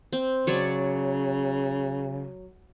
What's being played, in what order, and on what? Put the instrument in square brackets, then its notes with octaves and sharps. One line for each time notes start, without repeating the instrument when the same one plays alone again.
[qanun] C4
[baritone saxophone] C#3 [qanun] F#3 C#5 D5